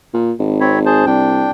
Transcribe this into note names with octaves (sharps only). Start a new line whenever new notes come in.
A#2
G#1
C4 C#5 B5
G#4 C5 A5
C2 D4 G5